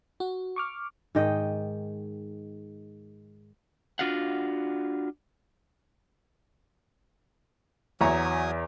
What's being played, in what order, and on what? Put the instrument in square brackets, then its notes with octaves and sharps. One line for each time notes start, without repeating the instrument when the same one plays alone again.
[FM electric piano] F#4
C#6 D6 F6
[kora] G#2 D#3 D#5 G5
[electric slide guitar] D4 F4 F#4 F5 F#5
[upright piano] E2 [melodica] F#3 G#5 D#6 [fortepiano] C#5 E5 A#5